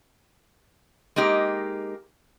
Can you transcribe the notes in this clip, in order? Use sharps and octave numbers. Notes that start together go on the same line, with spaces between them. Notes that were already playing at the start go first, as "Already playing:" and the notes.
G#3 A#3 D#4 G4